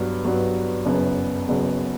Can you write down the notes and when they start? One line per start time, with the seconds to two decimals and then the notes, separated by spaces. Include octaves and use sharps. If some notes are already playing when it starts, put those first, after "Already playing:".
Already playing: G2 F#3 B3
0.25 G2 F#3 B3
0.85 F#1 F#2 F#3 B3
1.48 F#1 F#2 F#3 B3